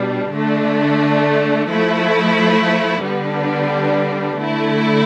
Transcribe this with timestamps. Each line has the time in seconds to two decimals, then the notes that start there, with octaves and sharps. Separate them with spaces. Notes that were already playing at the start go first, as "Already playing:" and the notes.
Already playing: B2 G3 D4
0.35 D3 A3 D4
1.69 F3 A3 E4
3.04 D3 G3 B3 D4
4.40 D3 A3 E4